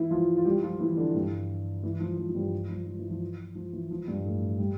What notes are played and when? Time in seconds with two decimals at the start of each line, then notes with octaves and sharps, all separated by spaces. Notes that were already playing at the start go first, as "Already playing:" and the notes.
Already playing: E3 E4
0.10 F3 F4
0.37 F4
0.45 G3 G4
0.62 F3 F4
0.79 E3 E4
0.97 D3 D4
1.14 G2 G3
1.83 E3
2.00 F3
2.18 F3
2.29 F3
2.35 G2 G3
2.69 F3
2.86 F3
2.99 E3
3.10 F3
3.55 F3
3.73 E3
3.91 F3
4.07 G2 G3
4.25 A2 A3
4.59 G3